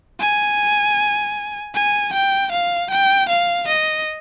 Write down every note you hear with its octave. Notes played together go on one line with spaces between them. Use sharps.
G#5
G#5
G5
F5
G5
F5
D#5